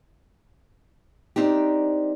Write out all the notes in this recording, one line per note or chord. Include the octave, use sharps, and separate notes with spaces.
C4 D4 D#4 G4